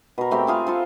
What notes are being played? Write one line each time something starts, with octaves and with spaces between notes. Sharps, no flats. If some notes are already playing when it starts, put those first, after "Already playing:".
B2 A#4
A3 C4 G4 G5
F4 G#4 F5
F4 A4 C5